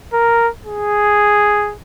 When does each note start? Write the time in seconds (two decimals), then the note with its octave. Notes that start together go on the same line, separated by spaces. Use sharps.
0.13 A#4
0.66 G#4